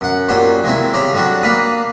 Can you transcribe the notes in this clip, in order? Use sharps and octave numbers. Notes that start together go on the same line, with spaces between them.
F#2 F#5
F#2 A#2 F#3 G3 C5
D#3 G#3 C4 E4
C#3 G4 C5 A#5
D3 F#3 G3 D4 F#4
A#3 D4 F5 B5 D#6